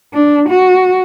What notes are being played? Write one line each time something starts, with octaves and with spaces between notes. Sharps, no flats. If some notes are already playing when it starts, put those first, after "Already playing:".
D4
F#4